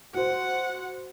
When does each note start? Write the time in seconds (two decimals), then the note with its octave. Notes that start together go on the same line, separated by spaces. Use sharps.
0.14 F#4 C5 F#5